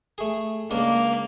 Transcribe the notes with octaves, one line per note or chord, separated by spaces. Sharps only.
A3 G#4
C#2 A#3 D4